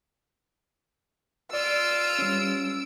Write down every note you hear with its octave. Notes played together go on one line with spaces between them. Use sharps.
F4 D5 E6 D7
G3 C#4